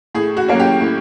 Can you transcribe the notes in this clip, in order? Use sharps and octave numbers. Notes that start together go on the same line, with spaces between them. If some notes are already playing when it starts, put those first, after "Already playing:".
A2 G#4
F#4
F#3 A#3 C#4
G4
A2